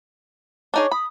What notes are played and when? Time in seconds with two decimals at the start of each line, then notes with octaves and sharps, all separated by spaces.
0.74 D4 D#4 G#4 C#5
0.91 B5 D#6